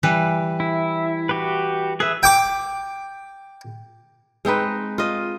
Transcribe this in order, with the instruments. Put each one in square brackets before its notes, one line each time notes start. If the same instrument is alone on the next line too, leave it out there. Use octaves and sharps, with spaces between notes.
[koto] E3 G3 B4
[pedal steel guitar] E4
F#4 G4 B4
[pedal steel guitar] G#4 E5 [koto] B4
[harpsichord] G5 D6
[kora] G#3 C4 D#4 B4
F4 D#5